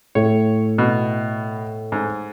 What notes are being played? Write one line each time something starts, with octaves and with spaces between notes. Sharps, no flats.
A2 C#5
B2
G#2